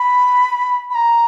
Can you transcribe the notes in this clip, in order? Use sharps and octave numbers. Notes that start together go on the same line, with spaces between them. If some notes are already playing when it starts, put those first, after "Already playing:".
Already playing: B5
B5
A#5